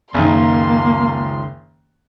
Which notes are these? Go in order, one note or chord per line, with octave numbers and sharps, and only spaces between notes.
F#1 C#2 D#3 A#3 C6